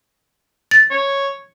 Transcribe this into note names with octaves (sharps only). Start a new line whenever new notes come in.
A6
C#5